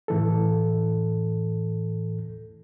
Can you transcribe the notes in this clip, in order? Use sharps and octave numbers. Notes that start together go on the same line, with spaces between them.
A2 E3 A4